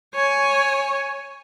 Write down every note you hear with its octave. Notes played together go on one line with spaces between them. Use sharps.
C#5 G#5